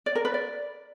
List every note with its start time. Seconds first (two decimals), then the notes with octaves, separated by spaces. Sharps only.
0.06 D5
0.15 A#4
0.25 B4
0.34 D5